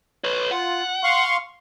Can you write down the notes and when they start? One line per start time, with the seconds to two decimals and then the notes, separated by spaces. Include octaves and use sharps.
0.24 B4 C#5
0.51 F4 F#5
1.03 F5 C6 C#6